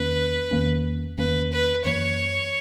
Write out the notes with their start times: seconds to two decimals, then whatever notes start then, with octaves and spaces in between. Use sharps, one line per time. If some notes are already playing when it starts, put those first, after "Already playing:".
Already playing: E2 D#3 A#3 C#4 B4
0.51 E2 D#3 A#3 C#4
1.18 E2 D#3 A#3 C#4 B4
1.52 B4
1.85 F#2 E3 A#3 C#5